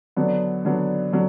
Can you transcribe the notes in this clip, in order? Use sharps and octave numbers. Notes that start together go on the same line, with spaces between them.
D3 F#3 B3 D4
D3 F#3 B3 D4
D3 F#3